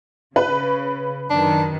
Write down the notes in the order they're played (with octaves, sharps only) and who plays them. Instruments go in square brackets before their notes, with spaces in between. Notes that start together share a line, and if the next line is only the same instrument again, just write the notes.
[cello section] C#3 [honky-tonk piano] B4
[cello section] F#2 D#3 [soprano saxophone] D4